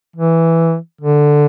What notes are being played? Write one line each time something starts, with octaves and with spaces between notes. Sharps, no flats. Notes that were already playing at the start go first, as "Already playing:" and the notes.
E3
D3